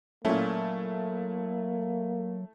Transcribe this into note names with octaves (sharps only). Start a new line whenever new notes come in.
A#2 F#3 A3 A#3 C#4 E4